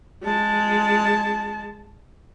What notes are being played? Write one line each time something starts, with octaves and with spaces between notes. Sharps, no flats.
G#3 A5